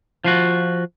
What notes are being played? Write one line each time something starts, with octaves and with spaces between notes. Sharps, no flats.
F3 F4 F#4